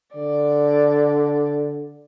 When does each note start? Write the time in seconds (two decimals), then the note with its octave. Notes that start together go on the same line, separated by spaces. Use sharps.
0.16 D3 D5